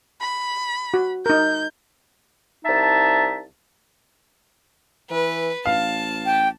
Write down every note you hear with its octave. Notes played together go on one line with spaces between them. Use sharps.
B5
F#4
D#4 A#4 G6
C2 D#4 E5 A5
E3 B4
A1 F5 A5
G5